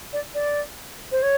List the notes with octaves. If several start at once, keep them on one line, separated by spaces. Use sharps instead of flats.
D5
D5
C5
C#5